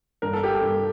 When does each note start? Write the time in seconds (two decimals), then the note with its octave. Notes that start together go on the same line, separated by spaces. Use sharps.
0.22 G2 A#4
0.33 A4
0.43 G4
0.53 A4
0.62 G2